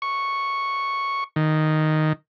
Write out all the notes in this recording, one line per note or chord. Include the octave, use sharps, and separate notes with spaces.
C#6
D#3